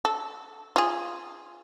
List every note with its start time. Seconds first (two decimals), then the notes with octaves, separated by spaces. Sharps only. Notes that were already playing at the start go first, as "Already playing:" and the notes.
0.05 A4
0.76 F4 G#4